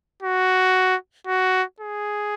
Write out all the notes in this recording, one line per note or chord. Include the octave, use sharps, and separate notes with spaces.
F#4
F#4
G#4